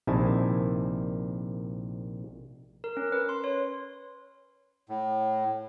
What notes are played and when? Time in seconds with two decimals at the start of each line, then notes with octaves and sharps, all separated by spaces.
0.07 A#1 C3 D#3 E4 G#5 A5
2.84 A#4
2.97 C#4
3.12 B4
3.29 C6
3.44 C#5
4.89 A2